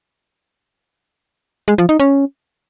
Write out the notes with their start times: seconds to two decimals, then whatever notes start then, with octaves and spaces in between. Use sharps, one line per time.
1.68 G#3
1.78 F3
1.89 D#4
2.00 C#4